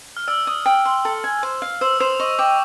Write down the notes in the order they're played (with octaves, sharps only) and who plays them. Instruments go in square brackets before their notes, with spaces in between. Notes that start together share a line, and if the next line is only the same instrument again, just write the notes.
[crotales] F6
[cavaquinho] D5 [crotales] E6
[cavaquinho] D#6
G5
C6
A4
G#5
C5
F5
[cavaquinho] C5 [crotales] E6
[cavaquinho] C5 [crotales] D#6
[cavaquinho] D#5 [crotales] C#6
[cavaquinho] G5 [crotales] D6